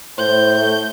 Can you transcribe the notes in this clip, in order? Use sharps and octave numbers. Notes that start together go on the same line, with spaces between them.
A2 C5 G6
A3